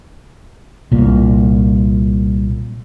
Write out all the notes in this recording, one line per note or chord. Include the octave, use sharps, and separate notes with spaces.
C2 A#2